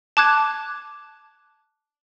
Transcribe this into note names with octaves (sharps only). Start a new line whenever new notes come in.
A5 D6 F#6 G#6